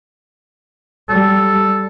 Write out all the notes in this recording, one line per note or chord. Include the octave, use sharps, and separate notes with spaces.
G3 A4